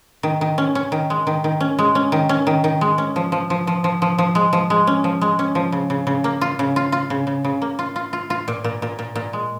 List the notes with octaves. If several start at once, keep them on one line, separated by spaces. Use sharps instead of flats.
D#3
D#3
C#4
C#4
D#3
G#3
D#3
D#3
C#4
G#3
C#4
D#3
C#4
D#3
D#3
G#3
C#4
F3
F3
F3
F3
F3
F3
F3
G#3
F3
G#3
C#4
F3
G#3
C#4
F3
C#3
C#3
C#3
A#3
F4
C#3
F4
F4
C#3
C#3
C#3
A#3
F4
F4
F4
F4
A#2
A#2
A#2
A#2
A#2
G#3